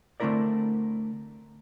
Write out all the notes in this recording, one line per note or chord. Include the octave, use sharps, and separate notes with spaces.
D3 A3 C4 E4 A#4 D5